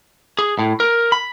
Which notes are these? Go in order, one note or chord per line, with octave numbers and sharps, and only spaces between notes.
G#4
A2
A#4
B5